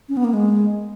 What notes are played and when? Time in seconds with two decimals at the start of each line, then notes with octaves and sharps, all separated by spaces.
0.09 C#4
0.17 B3
0.24 A#3
0.34 G#3